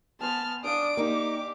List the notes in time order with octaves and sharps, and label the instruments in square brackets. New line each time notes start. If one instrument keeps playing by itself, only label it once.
[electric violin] B3 F6 [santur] C5 G#5 [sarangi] A5
[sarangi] D4 [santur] C5 D5 F5 [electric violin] D#6 D7
[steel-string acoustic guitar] A#3 D#4 [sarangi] G4 [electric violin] D6